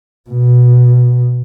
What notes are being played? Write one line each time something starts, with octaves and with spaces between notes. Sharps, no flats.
B2